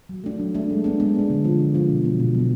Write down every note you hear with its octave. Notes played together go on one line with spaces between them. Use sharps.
F#3
A3 D4
F#3
A3 D4
G#3
B3 D4
G#3
B3 D4
D3
F3 G#3 D4 F4
D3
F3 G#3 D4 F4
B2
F#3 B3
B2
F#3 B3